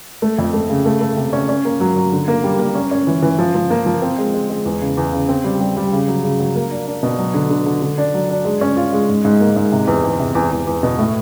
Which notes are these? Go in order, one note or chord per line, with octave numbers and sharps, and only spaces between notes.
A3
F2
A3
C#3
A3
A3
C3
C#4
C#4
A#3
F#3
F#3
D3
A#3
G3
A#3
C#4
C#4
E3
E3
F3
F3
A#3
F3
C4
G#3
G#3
G#3
E2
C#3
E2
C#3
C4
G3
G3
G3
C#3
F#3
C#3
F#3
A#3
D4
D4
B2
F#3
D3
D3
D3
D3
D4
F#3
D4
G#3
C#4
F4
G#3
G#2
G#2
A#3
G#2
C3
E2
E2
C3
E2
E2
E2
B2
A2